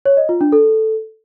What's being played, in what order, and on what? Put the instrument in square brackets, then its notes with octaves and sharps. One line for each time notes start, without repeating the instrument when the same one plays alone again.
[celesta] C#5
D#5
F4
D4
A4